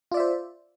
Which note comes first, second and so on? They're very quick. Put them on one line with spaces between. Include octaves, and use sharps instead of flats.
F4 D5 E5 C5